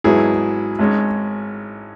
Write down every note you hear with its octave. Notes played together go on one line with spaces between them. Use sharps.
G#1 G#2 F#3 B3 E4 G#4
G#1 G#2 G#3 C#4